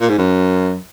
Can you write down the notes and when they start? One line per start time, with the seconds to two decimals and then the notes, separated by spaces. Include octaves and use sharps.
0.01 A#2
0.09 G#2
0.18 F#2